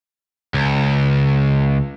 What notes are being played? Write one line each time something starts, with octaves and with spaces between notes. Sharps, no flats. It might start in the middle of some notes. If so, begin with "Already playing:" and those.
C#2